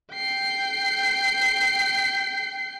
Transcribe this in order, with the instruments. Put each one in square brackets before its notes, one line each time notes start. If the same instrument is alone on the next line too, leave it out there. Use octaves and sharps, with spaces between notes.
[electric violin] G5 C7